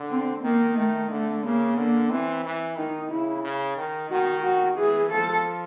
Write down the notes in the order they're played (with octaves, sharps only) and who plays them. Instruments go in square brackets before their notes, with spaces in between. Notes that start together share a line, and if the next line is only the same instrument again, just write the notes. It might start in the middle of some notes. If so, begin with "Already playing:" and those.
Already playing: [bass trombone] D3
[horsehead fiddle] C4
[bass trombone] D#3 [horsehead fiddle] A#3
[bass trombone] D#3 [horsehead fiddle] A3
[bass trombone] D3 [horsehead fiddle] A3
[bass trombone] C#3 [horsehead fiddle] A#3
[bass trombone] D3 [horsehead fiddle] A#3
[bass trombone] E3 [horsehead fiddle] C4
[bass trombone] E3
[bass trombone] D#3 [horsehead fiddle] D#4
[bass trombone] C#3 [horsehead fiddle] E4
[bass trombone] C#3
D#3
[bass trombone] D#3 [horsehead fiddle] F#4
[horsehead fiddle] F#4
[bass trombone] E3 [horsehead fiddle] G#4
[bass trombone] F3 [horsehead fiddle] A4